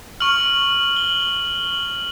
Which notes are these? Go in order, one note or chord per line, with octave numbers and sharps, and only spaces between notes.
C#6 F6 F#7
G7
F#7
G7
F#7